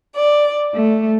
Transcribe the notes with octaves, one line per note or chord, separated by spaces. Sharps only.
D5
A3